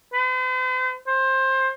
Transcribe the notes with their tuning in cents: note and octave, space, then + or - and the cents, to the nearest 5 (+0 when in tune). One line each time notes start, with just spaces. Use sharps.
C5 -45
C5 +20